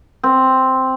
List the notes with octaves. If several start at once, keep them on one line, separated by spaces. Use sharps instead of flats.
C4